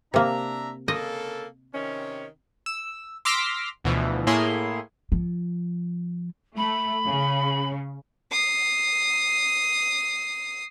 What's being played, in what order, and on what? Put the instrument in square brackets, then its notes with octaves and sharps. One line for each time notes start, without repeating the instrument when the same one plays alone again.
[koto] C3 A#3 [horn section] D4 E5 A#5
[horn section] C#3 A#3 A4 [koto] D#5
[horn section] C3 D#3 C#4
[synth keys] E6
C6 D6 E6 F6 A#6 B6
D2 B2 E3 F3
A2 A#3 E4 G#4 C#5 C6
[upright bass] F3
[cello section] A3 [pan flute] B5
[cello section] C#3
[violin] D#6 C7